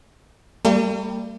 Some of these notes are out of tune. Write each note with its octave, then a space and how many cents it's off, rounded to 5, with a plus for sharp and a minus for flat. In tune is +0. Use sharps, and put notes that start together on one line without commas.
G3 +0 A#3 -45